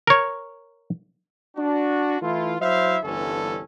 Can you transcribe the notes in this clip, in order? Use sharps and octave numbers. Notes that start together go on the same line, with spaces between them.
A#4 C#5
D4 F#4
E3 A3 E4 F4
F#3 E4 C5 E5 F5
G1 C2 D3 E3 C#4 A4